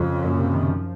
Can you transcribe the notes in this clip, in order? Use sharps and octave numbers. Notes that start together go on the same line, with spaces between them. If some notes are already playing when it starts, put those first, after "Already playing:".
Already playing: F2 C#3
F#2 A#2
A#2
C3
D#3
F3